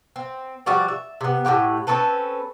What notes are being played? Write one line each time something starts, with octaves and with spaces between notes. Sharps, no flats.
C4
F3 G3 F#4 D5
E5
C3 B3
A2 G3 G4 F#5
C4 C#4 A4 B4